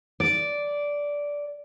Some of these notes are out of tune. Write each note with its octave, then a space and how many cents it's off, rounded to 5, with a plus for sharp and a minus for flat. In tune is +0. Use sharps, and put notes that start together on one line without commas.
D5 -10